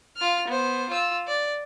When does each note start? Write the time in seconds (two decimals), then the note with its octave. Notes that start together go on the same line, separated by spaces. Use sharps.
0.17 F4 F6
0.48 B3 C5
0.89 F4 E6
1.28 D5